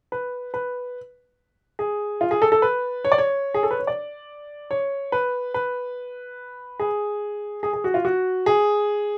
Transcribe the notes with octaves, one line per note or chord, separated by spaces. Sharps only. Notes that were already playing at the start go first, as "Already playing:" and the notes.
B4
B4
G#4
F4
G#4
A4
A4
B4
C#5
D5
C#5
G#4
A4
B4
C#5
D5
C#5
B4
B4
G#4
G#4
G#4
F#4
F4
F#4
G#4